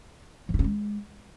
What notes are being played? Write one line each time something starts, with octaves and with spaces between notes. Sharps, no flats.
F3
D#4
C#4
G#3